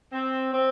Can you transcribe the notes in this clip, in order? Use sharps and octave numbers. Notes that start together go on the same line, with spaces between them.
C4
C4